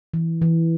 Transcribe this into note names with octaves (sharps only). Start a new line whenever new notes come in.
E3
E3